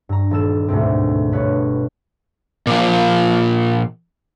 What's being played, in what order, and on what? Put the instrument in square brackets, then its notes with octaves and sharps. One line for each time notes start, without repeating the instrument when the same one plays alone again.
[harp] G2 A#5
D#1 A4 E7
D2 G#2 B2 A3 C4
G1 B4 C#5
[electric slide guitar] A#2 F3